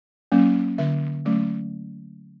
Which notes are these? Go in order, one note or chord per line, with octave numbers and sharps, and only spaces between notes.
F#3 A#3 C#4
D3 E5
F#3 A3 C#4